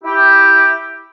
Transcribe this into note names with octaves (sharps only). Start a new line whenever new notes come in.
E4 G4